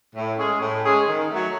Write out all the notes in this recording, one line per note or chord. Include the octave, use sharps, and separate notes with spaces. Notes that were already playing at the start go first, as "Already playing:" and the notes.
A2
G#3 C#4 G#4
A2
G#3 C#4 G#4
D#3
F#3 A3